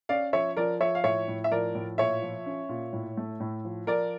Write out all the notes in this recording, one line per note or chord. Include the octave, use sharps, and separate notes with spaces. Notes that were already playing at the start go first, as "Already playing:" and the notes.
C#4 D5 F5
F3 C#5 E5
F3 A#4 D5
F3 C#5 E5
F5
A2 C#5 E5
A2
E5
F3 A#4 D5
A2
A#2 C#5 E5
F3
C#4
A#2
A2
A3
A2
F3
F3 A#4 D5